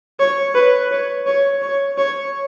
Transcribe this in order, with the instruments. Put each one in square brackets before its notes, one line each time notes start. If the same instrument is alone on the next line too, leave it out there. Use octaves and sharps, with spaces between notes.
[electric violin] C#5
B4
C#5
C#5
C#5
C#5